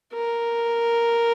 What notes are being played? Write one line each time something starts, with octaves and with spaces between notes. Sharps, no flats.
A#4